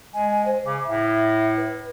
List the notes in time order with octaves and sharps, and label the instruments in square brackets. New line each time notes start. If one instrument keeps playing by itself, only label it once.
[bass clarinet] G#3 [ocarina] G#5
[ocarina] C5
[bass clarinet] C#3 [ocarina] D6
[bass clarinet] A2 [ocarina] E5
[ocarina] B4